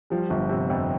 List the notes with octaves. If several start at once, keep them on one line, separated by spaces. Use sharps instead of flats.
F3 G3
G1
C3
F2